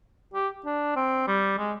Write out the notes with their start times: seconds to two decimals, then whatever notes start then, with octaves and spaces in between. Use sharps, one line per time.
0.34 G4
0.65 D4
0.96 C4
1.27 G3
1.58 G#3